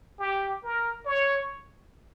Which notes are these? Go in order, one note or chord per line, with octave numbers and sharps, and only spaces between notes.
G4
A#4
C#5